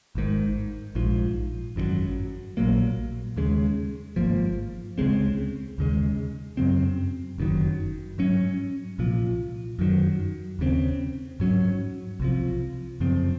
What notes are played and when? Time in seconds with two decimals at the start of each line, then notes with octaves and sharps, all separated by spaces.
0.15 G#1 G#2 D#3
0.95 A#1 G#2 F3
1.76 G#1 F#2 D#3 F#3
2.57 A#1 A#2 F#3 A#3
3.36 D#2 C#3 G#3
4.16 G#1 G#2 F3 A#3
4.98 C#2 C#3 G#3 C4
5.78 D#2 C#3 G#3
6.57 F#2 C#3 F#3 C4
7.38 F#1 F#2 D#3 F#3
8.18 G#2 F#3 C#4
8.98 C2 A#2 F3
9.79 F#2 D#3 F#3
10.59 D#2 C#3 F3 C4
11.40 G#2 F#3 C#4
12.20 C2 C3 F3
13.00 F#2 C#3 F3 C4